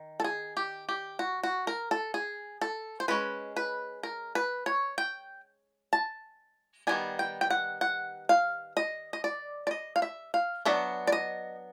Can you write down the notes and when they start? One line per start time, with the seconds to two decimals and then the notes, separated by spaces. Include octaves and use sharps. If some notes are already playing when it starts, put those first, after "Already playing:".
Already playing: D#3
0.20 A4
0.24 G#4
0.57 G4
0.89 G4
1.19 F#4
1.43 F#4
1.67 A#4
1.91 A4
2.14 G#4
2.61 A4
3.00 C5
3.08 G#3 C#4 B4
3.56 B4
4.03 A#4
4.35 B4
4.66 C#5
4.98 G5
5.93 A5
6.87 D#3 G3 B3 D4 G#5
7.19 G5
7.41 G5
7.50 F#5
7.81 F#5
8.29 F5
8.77 D#5
9.13 D#5
9.24 D5
9.67 D5
9.71 D#5
9.96 F5
10.02 E5
10.34 F5
10.65 F#3 B3 D4 E5
11.07 D5
11.12 D#5